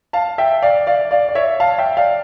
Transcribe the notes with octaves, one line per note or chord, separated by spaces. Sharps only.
F5 A5
E5 G5
D5 F5
D5 F5
D5 F5
D5
C#5 E5
F5 A5
E5 G5
D5 F5